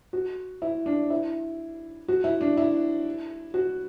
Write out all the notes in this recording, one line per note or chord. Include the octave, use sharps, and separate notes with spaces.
F#4
E4
D4
E4
F#4
E4
D4
E4
F#4